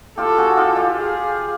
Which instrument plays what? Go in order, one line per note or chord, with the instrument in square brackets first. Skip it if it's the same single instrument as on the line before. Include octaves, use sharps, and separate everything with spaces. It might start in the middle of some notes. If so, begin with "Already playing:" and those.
[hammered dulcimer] F4 G4 [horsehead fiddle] A4
[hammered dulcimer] F#4 G#4
F4 G4
F4 G4
[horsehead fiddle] G#4